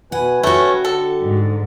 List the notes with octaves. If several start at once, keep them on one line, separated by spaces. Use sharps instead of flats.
B2 B4 F#5 G#5
A3 C#4 F#4 G4 B4 C#5
D3 A4
G#2